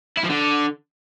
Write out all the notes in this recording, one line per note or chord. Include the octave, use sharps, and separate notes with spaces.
E4
F3
D3